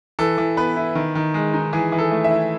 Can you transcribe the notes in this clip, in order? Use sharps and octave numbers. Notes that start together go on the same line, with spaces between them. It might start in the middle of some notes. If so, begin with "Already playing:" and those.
E3 A4
E3
B3 B4
E4
D#3
D#3
G#3
D#4
E3 G#4
E3
A4
A3
E5
E4